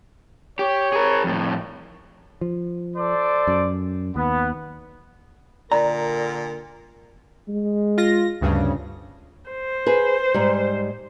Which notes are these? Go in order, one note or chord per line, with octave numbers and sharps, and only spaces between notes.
G4 C#5
G#4 A#4
F2 A2
F3
A4 C5 D5
F#2
D#2 B3
A#2 D3 A#4 D5 A#5
G#3
F4 A#6
D2 G2 C#3
C5
G#4 B4
G#2 G3